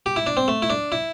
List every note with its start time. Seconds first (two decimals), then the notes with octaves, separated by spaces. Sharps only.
0.06 G4
0.16 E4
0.27 D4
0.37 C4
0.48 A3
0.62 E4
0.70 D4
0.92 E4